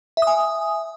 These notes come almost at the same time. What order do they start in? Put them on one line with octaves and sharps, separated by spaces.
E5 D#6 G#5